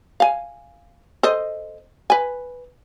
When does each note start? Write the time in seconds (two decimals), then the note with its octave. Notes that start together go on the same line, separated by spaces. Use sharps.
0.20 F5 G#5
1.23 A4 C5 D#5
2.10 B4 G#5